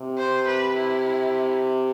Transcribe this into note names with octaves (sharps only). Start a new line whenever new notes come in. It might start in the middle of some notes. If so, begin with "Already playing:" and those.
Already playing: C3
C5
B4
E4